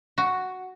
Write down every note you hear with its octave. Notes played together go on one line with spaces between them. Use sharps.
F#4